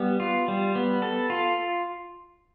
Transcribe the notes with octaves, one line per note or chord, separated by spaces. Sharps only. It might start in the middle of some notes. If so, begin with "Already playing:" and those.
Already playing: G3 B3
F4
G3
B3
A4
F4